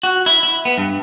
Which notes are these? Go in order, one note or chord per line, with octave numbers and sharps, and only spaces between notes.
F#4
E4
E4
B3
G2